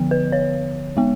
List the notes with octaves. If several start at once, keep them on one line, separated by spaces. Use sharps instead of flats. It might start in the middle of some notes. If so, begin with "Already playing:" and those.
Already playing: D3 F3 B3
B4
C#5
G#3 B3